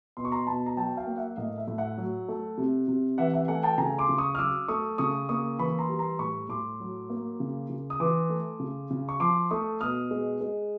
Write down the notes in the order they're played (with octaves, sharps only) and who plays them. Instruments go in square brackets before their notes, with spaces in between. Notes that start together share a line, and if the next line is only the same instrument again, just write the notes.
[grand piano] B2 C6
C#6
A#5 C6
B2 A5 B5
A#5
F#3 G5 A5
F5 G5
A#3
E5 F#5
A2 D#5 F5
E5
A2
E5 F#5
F#3
A3
C3
C3
E3 E5 F#5
E5 F#5
A3 F#5 G#5
G5 A5
C#3 G#5 A#5
C6 D6
C#3
C#6 D#6
F6
F#3 D6 E6
A3 C#6 D#6
C#3 C#6 D#6
A#3 C#6 D#6
E3 B5 C#6
A#5 C6
G3
A#5 C6
A2 B5 C#6
A2 C6 D6
F#3
A#3
C#3
C#3
D#6
E3 C6 D6
A3
C#3
C#3
C#6
F3 C6 D6
A3 C#6 D#6
B2 D#6 F6
G#3
G#3